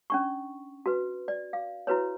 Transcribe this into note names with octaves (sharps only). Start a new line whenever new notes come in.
C#4 D4 C#6
F#4 B4
D5
F5
E4 F#4 B4 C#5